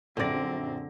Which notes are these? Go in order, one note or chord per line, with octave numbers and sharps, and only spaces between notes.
A#1 F#2 D3 C4 D5 A#6